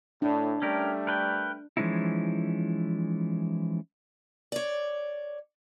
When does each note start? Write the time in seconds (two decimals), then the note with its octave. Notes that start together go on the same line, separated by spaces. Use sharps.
0.22 A2 D4
0.62 G3 A3 C#4 G4 A#4
1.07 A#4 B4 G5
1.77 E3 F3 G#3 C#4 D#4 E4
4.52 C#5 D5